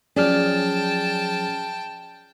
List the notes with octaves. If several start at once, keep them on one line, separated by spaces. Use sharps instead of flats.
F3 F#3 C#4 G#4 D5 G5 A5 F6